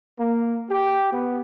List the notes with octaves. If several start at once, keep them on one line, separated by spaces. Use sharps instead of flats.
A#3
G4
B3